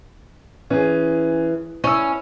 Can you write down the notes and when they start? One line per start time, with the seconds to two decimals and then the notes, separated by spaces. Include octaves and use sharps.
0.70 E3 C#4 G#4
1.84 C#4 E4 E6 D#7